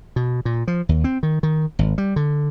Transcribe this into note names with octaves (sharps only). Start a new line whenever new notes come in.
B2
A#2
F3
D#2
C4
D#3
D#3
G#1
G3
D3